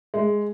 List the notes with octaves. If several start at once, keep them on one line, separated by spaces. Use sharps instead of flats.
G#3